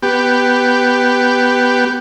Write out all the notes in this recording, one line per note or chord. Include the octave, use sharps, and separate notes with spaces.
B3 G4